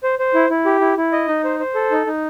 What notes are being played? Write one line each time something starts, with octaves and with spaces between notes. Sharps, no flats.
C5
C5
E4
E4
G4
E4
E4
D#5
D#4
C5
C5
A4
D#4
D#4